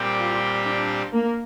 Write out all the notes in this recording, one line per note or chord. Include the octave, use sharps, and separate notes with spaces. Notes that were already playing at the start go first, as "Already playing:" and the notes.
Already playing: A#2 G3 C4 G4
F4
D4
A#3